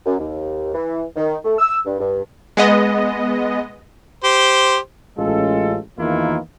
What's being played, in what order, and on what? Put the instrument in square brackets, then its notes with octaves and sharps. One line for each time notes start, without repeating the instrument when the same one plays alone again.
[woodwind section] F#2
D#2
E3
D#3
A3
E6
G2
G2
[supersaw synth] G#3 B3 D#5
[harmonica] G4 C5
[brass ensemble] A1 G#3 C#4 F4 A4
E2 D#3 E3 A#3 E4 F4